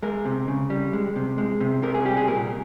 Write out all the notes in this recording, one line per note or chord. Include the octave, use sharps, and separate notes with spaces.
G#3 A#4
C3
C#3
G3
G#3
C3
G#3
C3
C3 A#4
G#4
G3 G4
G#4
A#2 A#4